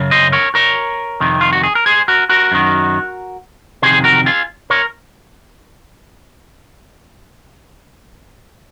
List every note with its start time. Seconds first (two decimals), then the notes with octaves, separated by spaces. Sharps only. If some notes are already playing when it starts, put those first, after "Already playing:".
Already playing: F#2 C#3
0.11 C5 D#5
0.32 A#4 C#5
0.55 A#4 C#5
1.20 F2 C3 D#3
1.41 F4
1.53 F#4
1.63 G#4
1.75 A#4
1.86 G#4 C5
2.08 F#4 A#4
2.29 F#4 A#4
2.52 F#2 D#3
3.82 F2 C3 D#3 G#4 C5
4.04 F#4 A#4
4.26 F4 G#4
4.70 A#4 C#5